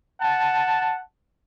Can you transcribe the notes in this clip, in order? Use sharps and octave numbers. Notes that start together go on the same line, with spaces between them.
F#5 A5